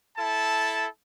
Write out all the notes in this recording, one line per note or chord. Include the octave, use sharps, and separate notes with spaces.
E4 A4 A5